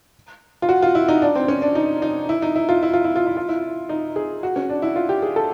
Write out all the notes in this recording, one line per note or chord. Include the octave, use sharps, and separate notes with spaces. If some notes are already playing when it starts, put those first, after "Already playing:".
F4
F#4
F4
E4
D#4
D4
C4
C#4
D4
D#4
D#4
E4
D#4
E4
F4
E4
F4
E4
F4
E4
F4
E4
D#4
G#4
F#4
C#4
D4
E4
F4
G4
G#4
A4